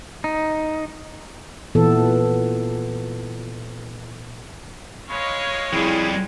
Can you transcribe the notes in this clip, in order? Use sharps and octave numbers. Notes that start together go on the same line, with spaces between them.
D#4
A#2 E3 B3 A4
G#3 C#5 F5 B5 C#6
F2 G3 E4 G#4